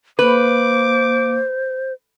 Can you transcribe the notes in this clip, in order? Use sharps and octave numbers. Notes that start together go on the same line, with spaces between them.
A#3 B4 C5 D6